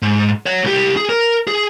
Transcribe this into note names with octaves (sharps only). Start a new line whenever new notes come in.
G#2
C#5 F#5
C2 G4
G#4
A#4
G#4